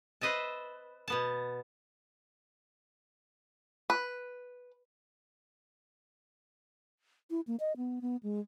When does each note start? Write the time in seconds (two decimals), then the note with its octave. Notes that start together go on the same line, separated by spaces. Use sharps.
0.21 B4 C5 D#5 E5 A5
1.08 B2 B3 A5
3.90 B4
7.31 E4
7.47 A#3
7.60 D#5
7.77 B3
8.02 B3
8.23 G#3